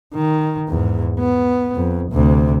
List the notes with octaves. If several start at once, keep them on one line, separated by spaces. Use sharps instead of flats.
D#3
E2 G#2
B3
F2
D2 C3